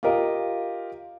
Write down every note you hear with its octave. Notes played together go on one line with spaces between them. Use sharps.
F4 G4 A#4 D#5 F5